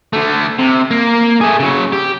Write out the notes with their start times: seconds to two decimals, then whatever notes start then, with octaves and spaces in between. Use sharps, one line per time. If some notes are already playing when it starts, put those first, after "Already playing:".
0.13 D3 A3
0.59 C3
0.91 A#3
1.41 A3 G#4
1.59 C#3 F#3
1.92 G4